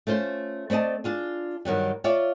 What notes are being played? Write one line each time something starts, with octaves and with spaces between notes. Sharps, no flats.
A3 C#4 F4 C5
A3 C4 D5 D#5 A5
D4 F4 G#4
G2 D#3 F#3 G3
F4 C#5 D5 E5 F5